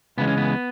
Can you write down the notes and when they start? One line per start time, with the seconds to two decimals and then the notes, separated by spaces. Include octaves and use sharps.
0.17 C#2 C#3 E3 G#3 B3
0.27 C#4
0.37 B3